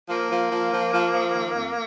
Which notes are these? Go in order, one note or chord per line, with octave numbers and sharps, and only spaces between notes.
F3 A#3
F3
F3
F3
F3
F3
D#3
F2